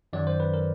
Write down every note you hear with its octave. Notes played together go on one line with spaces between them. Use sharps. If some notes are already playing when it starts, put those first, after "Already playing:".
F#2 D#3 F#3 D5
C5
B4
A#4